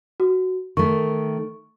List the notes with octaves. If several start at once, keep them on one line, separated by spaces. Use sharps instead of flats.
F#4
D#3 A3 C#6